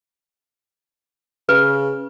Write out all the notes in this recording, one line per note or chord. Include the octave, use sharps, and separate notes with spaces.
C#3 B4